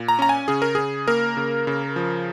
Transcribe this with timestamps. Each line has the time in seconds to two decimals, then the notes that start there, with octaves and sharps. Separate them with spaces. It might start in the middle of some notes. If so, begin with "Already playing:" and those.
Already playing: A#2
0.08 A#5
0.19 C#4 A#5
0.29 G#5
0.48 C#3 G#4
0.62 A#4
0.75 C#3 G#4
1.08 A#3 A#4
1.37 C#3
1.67 C#3
1.96 F3